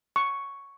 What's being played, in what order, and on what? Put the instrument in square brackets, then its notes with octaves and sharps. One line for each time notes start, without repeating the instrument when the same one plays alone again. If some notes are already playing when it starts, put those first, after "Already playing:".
[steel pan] C#6